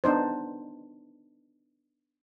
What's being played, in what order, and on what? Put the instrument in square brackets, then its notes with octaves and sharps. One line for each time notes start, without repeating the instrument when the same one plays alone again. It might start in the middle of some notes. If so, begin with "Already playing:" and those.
[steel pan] B3 D4 D#4 C5